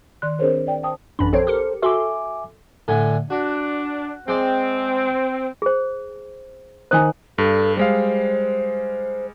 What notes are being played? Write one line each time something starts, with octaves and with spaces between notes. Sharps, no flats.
D#3 D5 C6 F#6
C4 D4 G#4 A#4 C5 C#5
D5 G5
C5 G5 A5 D#6
A1 F#2 D4 B5
A#1 C4 A4 C5 C#5
G4 A#4 C#7
F#4 A4 E5 G#5 C6 D6
A2 D3 G#5
D4 F#4
G#3 C4 D5
G#4 C5
D#3 C5 G#5 D#6 F#6
G2 A4
G3 G#3 C5 F5